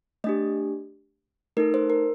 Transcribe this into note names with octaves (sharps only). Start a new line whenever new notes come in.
A3 D4 G4 D#5
A3 D#4 A4 A#4
C5
A#4